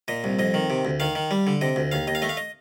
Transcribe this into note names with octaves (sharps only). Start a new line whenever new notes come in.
A#2 D#5
C2
F2 D#5
D#3
C3
D2
D#3 F5
D#3
G3
D3
C3 D#5
D2
D#2 F5
D#2 D#5
F5
A3 D#5
F5
D#5